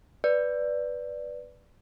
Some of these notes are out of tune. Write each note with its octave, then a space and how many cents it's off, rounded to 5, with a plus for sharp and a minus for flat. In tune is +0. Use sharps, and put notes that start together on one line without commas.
B4 +0 D5 +0